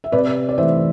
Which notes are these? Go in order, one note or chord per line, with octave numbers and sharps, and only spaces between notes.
E5
C3 B4 D5
D5
E3 A3 C5 E5